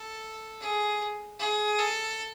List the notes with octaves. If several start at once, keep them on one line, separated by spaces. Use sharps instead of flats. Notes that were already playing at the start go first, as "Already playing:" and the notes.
Already playing: A4
G#4
G#4
A4